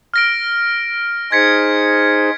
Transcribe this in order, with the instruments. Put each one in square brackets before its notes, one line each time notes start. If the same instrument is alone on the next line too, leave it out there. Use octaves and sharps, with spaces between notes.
[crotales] F6 A#6 D7
[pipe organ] D#4 G#4 C5 [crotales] G#6 B6 C#7